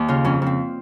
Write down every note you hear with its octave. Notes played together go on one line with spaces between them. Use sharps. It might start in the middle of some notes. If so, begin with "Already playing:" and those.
Already playing: D#2
C#3 F4
F2 C#4
F2 C4